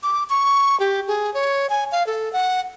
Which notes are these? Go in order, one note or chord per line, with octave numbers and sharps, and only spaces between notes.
D6
C#6
G4
G#4
C#5
G#5
F5
A4
F#5